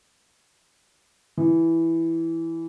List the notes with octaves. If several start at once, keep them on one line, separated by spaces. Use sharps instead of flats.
E3